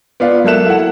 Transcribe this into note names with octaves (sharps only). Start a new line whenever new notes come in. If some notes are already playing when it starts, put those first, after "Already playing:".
B3 F4 D5 F5
F#3 A#3 A4 E5 F#6 E7
E4 F#5